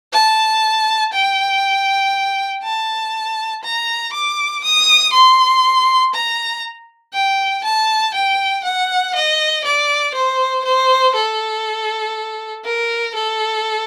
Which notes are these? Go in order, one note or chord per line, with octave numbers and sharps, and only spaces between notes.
A5
G5
A5
A#5
D6
D#6
C6
A#5
G5
A5
G5
F#5
D#5
D5
C5
C5
A4
A#4
A4